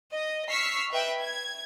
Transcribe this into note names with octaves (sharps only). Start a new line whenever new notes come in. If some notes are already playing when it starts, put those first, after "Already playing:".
D#5
C#6 E6 F6 B6 C7
B4 D#5 E5 G5 B5
G#6